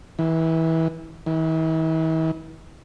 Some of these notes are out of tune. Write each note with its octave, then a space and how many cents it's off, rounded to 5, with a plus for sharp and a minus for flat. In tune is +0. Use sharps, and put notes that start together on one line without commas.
E3 -25
E3 -45